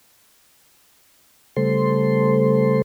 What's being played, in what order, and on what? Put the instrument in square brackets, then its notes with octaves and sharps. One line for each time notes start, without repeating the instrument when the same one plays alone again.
[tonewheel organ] C#3 G3 A3 A4 C5 C6